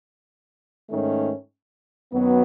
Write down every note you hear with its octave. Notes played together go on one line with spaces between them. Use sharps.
G#2 D#3 A3 C#4
F#2 D#3 F#3 B3